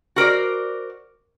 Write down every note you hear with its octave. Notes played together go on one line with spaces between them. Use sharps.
F#4 A#4 C5 D5